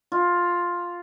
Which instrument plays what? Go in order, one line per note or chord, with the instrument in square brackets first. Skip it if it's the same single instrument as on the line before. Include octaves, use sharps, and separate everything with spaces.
[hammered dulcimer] F4